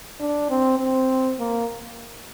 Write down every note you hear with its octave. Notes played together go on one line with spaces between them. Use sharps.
D4
C4
C4
A#3